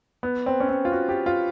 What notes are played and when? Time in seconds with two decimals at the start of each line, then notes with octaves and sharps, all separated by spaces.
0.23 B3
0.46 C4
0.60 C#4
0.69 C4
0.85 F4
0.92 F#4
1.09 G4
1.26 F4